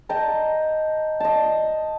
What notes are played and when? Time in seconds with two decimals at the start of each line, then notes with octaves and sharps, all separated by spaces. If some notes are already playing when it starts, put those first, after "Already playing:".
0.09 D#5 G5 A5 A#5
1.20 D#5 A5